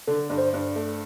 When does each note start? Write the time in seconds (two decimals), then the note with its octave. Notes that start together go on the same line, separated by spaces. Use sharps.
0.08 D3 A4
0.30 G2
0.38 C5
0.53 G2
0.76 A3